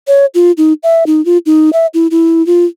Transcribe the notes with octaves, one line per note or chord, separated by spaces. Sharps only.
C#5
F4
D#4
E5
D#4
F4
D#4
E5
E4
E4
F4